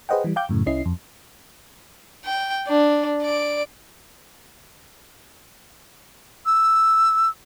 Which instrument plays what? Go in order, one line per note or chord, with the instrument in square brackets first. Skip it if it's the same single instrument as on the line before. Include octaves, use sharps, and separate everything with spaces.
[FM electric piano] G#4 B4 C5 D#5 F#5 G5
E3 G3
F5 G5 D6 G6
F#2 A2 C#3
C2 C#4 E4 D#5 C7
F2
[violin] G5
D4
D5 D7
[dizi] E6